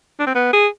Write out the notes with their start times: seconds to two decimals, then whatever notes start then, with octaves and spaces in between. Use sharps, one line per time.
0.20 D4
0.27 C4
0.35 B3
0.53 G#4